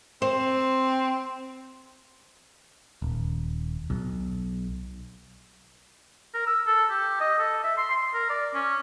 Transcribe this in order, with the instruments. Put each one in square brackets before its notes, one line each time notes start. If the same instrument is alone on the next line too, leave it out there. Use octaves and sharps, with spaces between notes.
[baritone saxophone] C4 [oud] C5
[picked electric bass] D#1
B1
[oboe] A#4
E6
A4
G4
D#5
A4
E5
C6
C6
A#4
D5
C#4